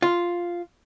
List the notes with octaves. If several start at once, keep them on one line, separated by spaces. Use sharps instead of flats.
F4